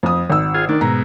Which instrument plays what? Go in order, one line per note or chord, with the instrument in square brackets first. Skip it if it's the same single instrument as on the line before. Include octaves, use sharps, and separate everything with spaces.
[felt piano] F2 D#6
G#1 E6
[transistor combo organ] F4 G#4
[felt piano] D#3 [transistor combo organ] D4
[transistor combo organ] G#2 B2 [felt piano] A#5